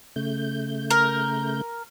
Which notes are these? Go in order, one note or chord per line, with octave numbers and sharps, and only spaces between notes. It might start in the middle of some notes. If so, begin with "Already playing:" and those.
C#3 A3 G6
A#4